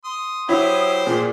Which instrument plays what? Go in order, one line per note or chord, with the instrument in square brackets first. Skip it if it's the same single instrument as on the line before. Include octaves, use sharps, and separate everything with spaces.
[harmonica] C6 [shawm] D#6
[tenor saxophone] F#3 [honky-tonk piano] E4 [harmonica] G4 C5
[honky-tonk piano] A#2 [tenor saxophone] G#4